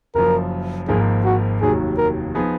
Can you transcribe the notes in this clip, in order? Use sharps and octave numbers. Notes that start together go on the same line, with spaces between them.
F#1 F#2 F3 A#4
G#1 G#2 F3 A#3 G#4
F#4
F1 D#2 D#3 F#3 G#4
A#4
F3 B3 D#4 G#4